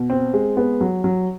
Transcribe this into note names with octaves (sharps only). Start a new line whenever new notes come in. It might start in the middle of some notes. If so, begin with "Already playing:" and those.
Already playing: B2
C4
G#3
B3
F#3
F#3